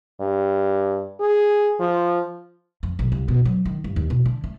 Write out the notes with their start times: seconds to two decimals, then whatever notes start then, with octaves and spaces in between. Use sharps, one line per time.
0.20 G2
1.21 G#4
1.80 F3
2.83 F2
2.99 B1
3.12 C2
3.28 B2
3.45 F#3
3.66 D#3
3.84 G2
3.96 D#2
4.10 B2
4.26 D3
4.44 A3